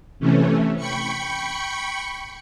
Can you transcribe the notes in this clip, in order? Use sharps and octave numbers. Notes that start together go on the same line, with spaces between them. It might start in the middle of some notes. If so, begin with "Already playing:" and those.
C3 E3 A3 C#4
G5 B5 C#6 C#7